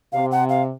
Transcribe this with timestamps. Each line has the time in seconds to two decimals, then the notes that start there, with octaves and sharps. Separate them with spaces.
0.12 C3 F5
0.31 F#5
0.49 F5